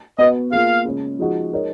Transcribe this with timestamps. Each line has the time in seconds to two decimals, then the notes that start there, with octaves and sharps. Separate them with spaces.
0.18 B3 F#4 B4 D#5
0.52 A#3 F4 G#4 F5
0.85 C#3 G#3 C#4
1.19 F3 G#3 D#4 F#4
1.52 G#3 D#4 A#4 C#5